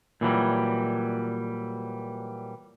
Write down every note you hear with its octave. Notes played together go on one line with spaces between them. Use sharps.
A#2 E3 F#3 G3